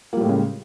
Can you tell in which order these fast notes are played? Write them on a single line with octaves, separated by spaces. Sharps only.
A#3 G3 A2 G#3 C#3